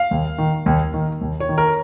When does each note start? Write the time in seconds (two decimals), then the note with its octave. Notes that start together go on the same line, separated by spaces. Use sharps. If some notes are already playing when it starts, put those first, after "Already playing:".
Already playing: F5
0.11 D#2
0.38 D#3
0.66 D#2
0.94 D#3
1.21 D#2
1.40 C#5
1.49 D#3
1.58 A#4